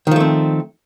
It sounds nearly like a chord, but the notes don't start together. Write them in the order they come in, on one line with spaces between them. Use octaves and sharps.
D#3 F3 A3 C4